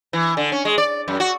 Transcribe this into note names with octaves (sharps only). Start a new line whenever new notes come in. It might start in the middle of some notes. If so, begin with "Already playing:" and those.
E3
D3
C#4
G#3
D5
F#2
F#4